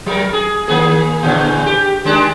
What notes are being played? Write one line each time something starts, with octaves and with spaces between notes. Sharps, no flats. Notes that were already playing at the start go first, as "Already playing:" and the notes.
F#3 A#4
G#4
D#3 A#3 G#4
A#2 D3 E3
G4
D#3 G#3 D4